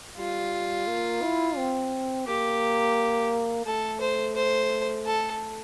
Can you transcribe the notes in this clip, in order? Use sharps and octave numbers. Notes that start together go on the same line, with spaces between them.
G3 F4
A#3
E4
C4
A#3 G4
A3 A4
C5
C5
A4